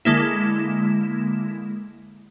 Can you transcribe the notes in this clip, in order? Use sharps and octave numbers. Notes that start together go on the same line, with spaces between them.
D3 G#3 A#3 E4